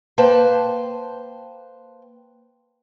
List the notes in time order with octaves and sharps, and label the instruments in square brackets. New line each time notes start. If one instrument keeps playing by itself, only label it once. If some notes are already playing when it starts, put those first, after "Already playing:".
[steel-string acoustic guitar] A#3 B4 C5 G5 A5